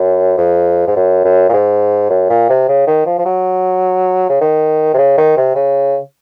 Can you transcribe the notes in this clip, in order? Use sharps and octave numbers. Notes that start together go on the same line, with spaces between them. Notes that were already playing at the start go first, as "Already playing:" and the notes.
Already playing: F#2
F2
G#2
F#2
F#2
A#2
G#2
F#2
A#2
C3
C#3
D#3
F3
F3
F#3
C#3
D#3
C3
C#3
D#3
C3
C#3